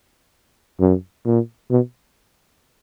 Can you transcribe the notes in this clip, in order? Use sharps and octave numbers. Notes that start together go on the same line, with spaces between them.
F#2
A#2
B2